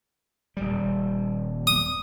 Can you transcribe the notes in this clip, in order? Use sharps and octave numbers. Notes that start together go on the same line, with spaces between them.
D#1 G3
D#6